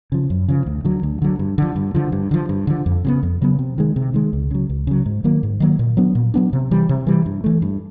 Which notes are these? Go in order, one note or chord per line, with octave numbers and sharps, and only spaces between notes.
C#3 F3
F#2
C#3 F3
D2
D3 F#3
D2
D3 F#3
G2
D3 F3
G2
D3 F3
G2
D3 F3
G2
D3 F3
F2
C#3 F#3 B3
F2
C#3 F#3 B3
C3
D#3 G#3
C3
D#3 G#3
C#2
C#3 F#3
C#2
C#3 F#3
G#2
D#3 F#3 A#3
G#2
D#3 F#3 A#3
A#2
F#3 B3 D4
A#2
F#3 B3 D4
C3
E3 G3
C3
E3 G3
G2
E3 A3
G2